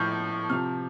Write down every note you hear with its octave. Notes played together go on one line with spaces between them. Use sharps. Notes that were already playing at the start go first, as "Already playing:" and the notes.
Already playing: A2 F3 F6 G6
C3 F3 F6